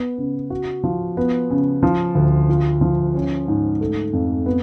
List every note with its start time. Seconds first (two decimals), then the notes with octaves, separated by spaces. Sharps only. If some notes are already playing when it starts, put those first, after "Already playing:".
Already playing: B3
0.18 C#3
0.50 F#4
0.84 F3
1.17 B3
1.50 C#3
1.83 F3
2.15 D2
2.49 F4
2.81 F3
3.15 C#4
3.48 G#2
3.81 A3
4.13 F2
4.46 B3